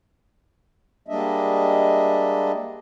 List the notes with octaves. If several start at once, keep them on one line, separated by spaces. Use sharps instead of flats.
G3 G#3 A#3 D4 D#5 E5